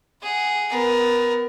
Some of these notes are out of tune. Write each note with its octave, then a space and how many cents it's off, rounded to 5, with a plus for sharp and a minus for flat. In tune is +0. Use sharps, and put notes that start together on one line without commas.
G#4 +0 F#5 +0
B3 +20 A#4 +25